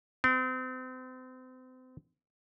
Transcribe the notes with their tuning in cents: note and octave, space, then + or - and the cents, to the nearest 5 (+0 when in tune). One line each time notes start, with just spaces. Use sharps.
C4 -35